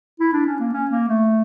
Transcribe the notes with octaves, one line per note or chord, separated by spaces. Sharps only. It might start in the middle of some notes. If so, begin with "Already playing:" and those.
E4
D4
C#4
A#3
C#4
A#3
A3